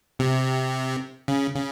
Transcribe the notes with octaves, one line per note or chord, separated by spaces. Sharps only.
C3
C#3
C#3